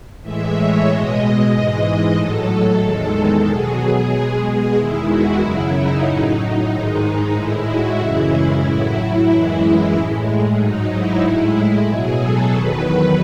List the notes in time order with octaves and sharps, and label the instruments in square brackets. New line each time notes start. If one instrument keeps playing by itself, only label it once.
[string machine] A2 E3 G#3 E5
C#5
B2 G#3 D#5
G#2 E3 G#3 D#5
A2 F#3 A4
E2 D#3 G#3 A4
B2 F#3 G#4
B2 G#3 G#4
E2 D#3 G#3 E4
F#4
F#2 C#3 F#3 E4
D#4
A2 F#3
G#2 D#3 G#3
A2 G#3 E4
F#4
F#2 C#3 E3 G#3 E4
A2 F#3 E4
F#2 E3 G#3
A2 G#3
G#2 F#3 D#4
E4
A2 G#3
B2 F#3 G#4
A4
E2 D#3 F#3 B4